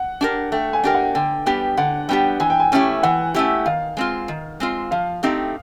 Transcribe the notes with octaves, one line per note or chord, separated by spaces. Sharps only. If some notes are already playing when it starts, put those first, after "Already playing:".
Already playing: F#5
D4 G4 A#4
A3 G5
G#5
D4 G4 A#4 G5
F#5
D3 G5
G3 B3 D4 G4 G5
D3 F#5
G3 B3 D4 G4 G5
E3 G#5
G5
G#5
A3 C#4 E4 G4 G5
E3 F#5
A3 C#4 E4 G4
D#3 F5
G#3 C4 F4
D#3
G#3 C4 F4
F3 F5
A3 C4 D#4 G4